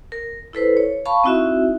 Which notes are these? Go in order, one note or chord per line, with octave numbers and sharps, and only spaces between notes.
A#4
E4 A4 B4 C5
C#5
F5 A5 B5 C#6
C4 D#4 E4 F#4 E5